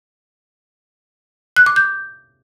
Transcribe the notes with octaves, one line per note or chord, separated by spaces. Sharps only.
F#6
D6
G6